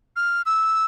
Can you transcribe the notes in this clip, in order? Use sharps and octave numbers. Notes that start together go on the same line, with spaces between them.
F6
E6